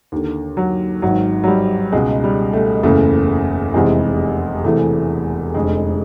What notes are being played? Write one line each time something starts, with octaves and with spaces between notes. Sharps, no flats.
D#2 D3
F#3
G#1 G#2 D#3 F#3
F#3
G3
C#2 B2 G#3
G3
A3
F#1 E2 C#3 A3
F1 E2 C3 E3 G#3
E1 E2 C3 E3 A3
F1 F2 D3 G#3